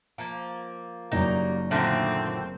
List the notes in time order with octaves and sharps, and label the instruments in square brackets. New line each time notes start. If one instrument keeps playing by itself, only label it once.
[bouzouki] F3 A#3
[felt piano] F#1 F#3 [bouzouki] G3 A#3 [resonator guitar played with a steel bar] D#4
[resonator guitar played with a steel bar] A#2 D3 D#3 [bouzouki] A3 F#4 A#4 [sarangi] C4